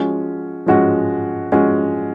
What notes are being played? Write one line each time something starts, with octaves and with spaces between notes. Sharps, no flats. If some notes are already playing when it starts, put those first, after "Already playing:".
Already playing: F3 G#3 C#4 F#4
F3 G#3 C#4 F#4
F3 G#3 C#4 F#4